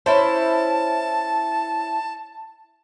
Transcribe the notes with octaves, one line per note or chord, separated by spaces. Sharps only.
C#4 E4 C5 A5